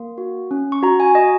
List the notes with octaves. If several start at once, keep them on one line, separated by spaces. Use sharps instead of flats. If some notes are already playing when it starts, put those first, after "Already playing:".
Already playing: A#3
F#4
C#4
C#6
F#4 A#5
G#5
F#4 D#5